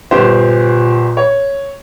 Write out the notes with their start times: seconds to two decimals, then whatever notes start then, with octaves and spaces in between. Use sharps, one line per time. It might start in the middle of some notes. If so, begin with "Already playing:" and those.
0.11 G1 A#2 G4 C5
1.17 C#5